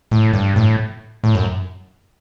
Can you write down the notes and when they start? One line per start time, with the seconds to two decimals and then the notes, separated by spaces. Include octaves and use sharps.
0.11 A2
0.33 G2
0.56 A2
1.24 A2
1.35 F#2